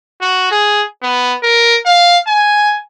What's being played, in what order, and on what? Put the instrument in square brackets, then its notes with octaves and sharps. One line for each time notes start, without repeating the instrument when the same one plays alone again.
[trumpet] F#4
G#4
B3
A#4
F5
G#5